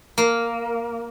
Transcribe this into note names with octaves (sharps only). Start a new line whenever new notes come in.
A#3